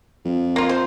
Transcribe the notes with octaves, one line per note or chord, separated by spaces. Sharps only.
F2
A#3 F4
C5